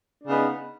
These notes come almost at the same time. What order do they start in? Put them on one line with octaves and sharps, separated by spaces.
D4 C#3 B3 D#4